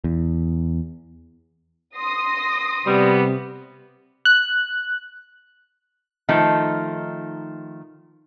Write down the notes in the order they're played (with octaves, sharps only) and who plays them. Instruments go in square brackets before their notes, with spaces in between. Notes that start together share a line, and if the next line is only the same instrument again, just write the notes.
[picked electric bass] E2
[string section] C6 D#6 A#6
[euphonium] C3 [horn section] G3 [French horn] B3
[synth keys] F#6
[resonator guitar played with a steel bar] D#3 F3 A3 D#4